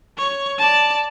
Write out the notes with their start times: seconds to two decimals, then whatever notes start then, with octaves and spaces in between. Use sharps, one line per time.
0.18 C#5
0.59 D5 A5